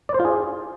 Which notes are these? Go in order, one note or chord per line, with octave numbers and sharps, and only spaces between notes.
D5
C5
F4
G#4